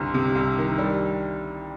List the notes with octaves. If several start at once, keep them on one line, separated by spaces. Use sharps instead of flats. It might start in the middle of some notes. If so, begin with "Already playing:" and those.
Already playing: G1 C2
C3
C2
D#3
G3